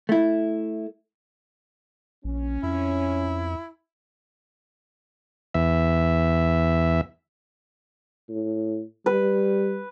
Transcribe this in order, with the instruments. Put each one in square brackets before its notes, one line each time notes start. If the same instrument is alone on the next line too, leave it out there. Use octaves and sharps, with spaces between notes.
[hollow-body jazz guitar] A3 E4
[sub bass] A#1 [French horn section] C#4
[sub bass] F2 [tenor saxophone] E4
[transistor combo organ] E2 E5
[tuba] A2
[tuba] G3 [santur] B4